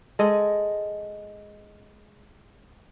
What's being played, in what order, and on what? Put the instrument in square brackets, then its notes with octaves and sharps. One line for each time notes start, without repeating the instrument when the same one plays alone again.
[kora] G#3 A4 D#5